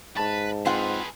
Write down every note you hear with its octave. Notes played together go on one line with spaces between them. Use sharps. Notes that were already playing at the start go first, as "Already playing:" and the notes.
G#2 B4 A5
C4 F4 G#4 B4 F#5